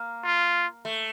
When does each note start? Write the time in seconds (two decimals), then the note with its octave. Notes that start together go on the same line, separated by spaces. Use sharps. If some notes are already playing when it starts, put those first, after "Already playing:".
Already playing: A#3
0.25 F4
0.85 A3